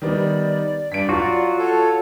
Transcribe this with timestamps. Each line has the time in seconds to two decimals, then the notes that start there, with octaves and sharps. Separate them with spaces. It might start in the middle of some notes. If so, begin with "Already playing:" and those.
0.02 D#3 G3 B3 D5
0.92 G2 D5 B6 D7
1.09 F#3 F4 F#4
1.58 A4 C#5